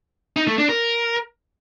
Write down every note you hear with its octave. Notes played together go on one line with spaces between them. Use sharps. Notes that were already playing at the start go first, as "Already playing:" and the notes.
D#4
A3
D4
A#4